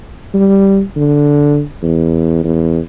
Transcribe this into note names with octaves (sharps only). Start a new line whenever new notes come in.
G3
D3
E2
E2